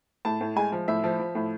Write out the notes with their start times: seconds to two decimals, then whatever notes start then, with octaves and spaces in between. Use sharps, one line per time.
0.25 A2 A5
0.41 A2
0.56 G#3 G#5
0.72 F3
0.88 A2 E5
1.04 F3
1.19 F3
1.35 A2